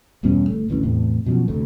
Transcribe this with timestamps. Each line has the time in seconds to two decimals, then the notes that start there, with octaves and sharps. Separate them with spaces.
0.23 E2 G2 B2 C#4
0.48 G1 A3
0.68 G#1 D2 E3 C#4
0.83 E2 A2 C3
1.25 F#2 B2 F3 C#4
1.48 D2 C3 A3